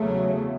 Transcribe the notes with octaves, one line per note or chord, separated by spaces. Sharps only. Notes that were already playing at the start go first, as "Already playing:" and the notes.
Already playing: E2 C#3 F#3 A3